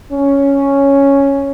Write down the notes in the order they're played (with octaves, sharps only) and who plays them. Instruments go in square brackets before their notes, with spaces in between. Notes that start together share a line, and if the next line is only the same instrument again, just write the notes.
[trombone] C#4